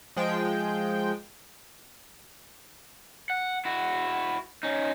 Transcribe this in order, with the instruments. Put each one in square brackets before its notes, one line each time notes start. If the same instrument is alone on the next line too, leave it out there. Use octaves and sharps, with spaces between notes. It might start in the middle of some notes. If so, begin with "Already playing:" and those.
[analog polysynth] F3 G#3 G5
[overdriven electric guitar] F#5
E4 F#4
C#4 D#4